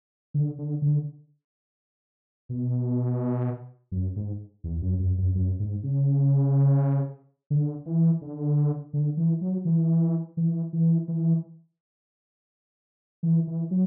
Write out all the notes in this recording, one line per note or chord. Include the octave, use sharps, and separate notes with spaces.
D3
D3
D3
B2
F#2
G#2
E2
F#2
F#2
F#2
F#2
G#2
C#3
D3
E3
D3
D3
E3
F#3
E3
E3
E3
E3
E3
E3
F#3